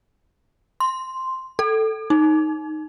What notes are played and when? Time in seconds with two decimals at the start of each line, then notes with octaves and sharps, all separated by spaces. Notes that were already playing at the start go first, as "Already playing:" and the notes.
0.80 C6
1.59 A4
2.10 D#4